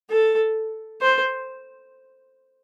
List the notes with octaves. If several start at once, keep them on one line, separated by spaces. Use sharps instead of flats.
A4
C5